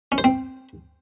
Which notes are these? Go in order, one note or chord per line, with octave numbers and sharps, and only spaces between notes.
C#4
C5
C4